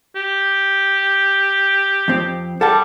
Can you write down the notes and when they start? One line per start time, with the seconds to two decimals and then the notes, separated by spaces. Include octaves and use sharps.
0.16 G4
2.08 F2 C4
2.61 G3 A4 F#5 A5